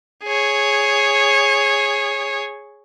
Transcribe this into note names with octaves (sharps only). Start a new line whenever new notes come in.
G#4 C#5